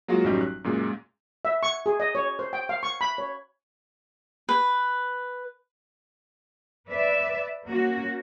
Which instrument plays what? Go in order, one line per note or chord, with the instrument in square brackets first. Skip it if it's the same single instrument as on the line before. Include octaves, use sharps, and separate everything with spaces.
[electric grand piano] F#3 G#3 A#3 F4 F#4
A1 F#2 F#3 G3 D#4 G4
F#6
F#2 A#2 G#3
[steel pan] E5
C#6
G#4
D#5
C#5
C5
G5
F5
C#6
B5
C#5
[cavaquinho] B4
[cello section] B4 D5 E5
A#3 C#4 F#4